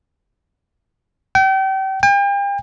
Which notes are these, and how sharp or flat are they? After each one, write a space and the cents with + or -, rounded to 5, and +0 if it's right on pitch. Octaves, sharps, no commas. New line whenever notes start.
G5 -35
G5 +40